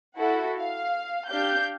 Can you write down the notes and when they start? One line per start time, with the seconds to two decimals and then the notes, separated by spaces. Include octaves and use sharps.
0.17 E4 F#4 A4 F#5
0.56 F5
1.29 D4 G4 F5 G6